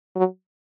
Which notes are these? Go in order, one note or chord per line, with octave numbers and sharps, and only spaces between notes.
F#3